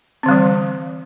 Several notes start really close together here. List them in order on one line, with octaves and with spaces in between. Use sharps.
C4 D3 G3 E3